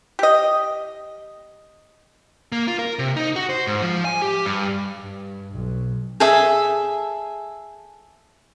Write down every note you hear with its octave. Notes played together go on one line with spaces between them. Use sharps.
G4 D#5
A#3
F4
A#4
C3
D#4
F#4
C5
G#2
F3
G#5
G4
G2
G2
B1
G#4 A4 E5